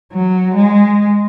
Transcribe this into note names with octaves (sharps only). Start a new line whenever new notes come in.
F#3
G#3